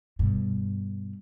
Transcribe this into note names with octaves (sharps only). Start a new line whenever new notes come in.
G2 B2